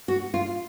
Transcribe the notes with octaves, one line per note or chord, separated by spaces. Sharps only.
F#4
F4